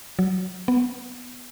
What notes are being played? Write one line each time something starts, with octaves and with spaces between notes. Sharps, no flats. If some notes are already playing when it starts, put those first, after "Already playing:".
F#3
B3